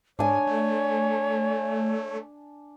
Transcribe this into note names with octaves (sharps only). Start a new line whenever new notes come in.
G#2 D4 C#5 G#5
A3